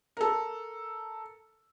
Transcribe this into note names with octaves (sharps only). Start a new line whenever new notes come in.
A4 A#4